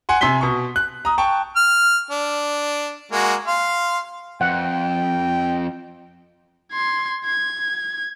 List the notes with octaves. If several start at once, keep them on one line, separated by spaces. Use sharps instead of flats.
F#5 G#5 C6
C3 G#5 C6 B6 G7
B2 C#6
F#6
A#5 D#6
G5 A5 C#6
F6
D4
G#3 A#3 F#4
F5 C6
F2 F#5 G5
C6 G#6
G#6